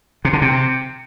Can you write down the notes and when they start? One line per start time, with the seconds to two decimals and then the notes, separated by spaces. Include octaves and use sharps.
0.25 C3
0.33 D3
0.42 C3